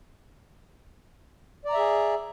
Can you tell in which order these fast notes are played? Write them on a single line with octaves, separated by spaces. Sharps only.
D5 A#5 E5 G#4